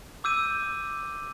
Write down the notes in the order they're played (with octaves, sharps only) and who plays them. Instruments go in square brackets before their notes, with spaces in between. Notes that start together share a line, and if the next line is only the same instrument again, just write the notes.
[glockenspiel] D6 E6 G6 D#7